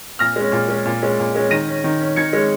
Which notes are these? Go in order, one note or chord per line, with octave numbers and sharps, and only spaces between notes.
A#2 F6 A#6
G#3 C#4
A#2
G#3 C#4
A#2
G#3 C#4
A#2
G#3 C#4
D#3 A#6 D#7
C#4
D#3
C#4
D#3 G#6 C#7
G#3 C#4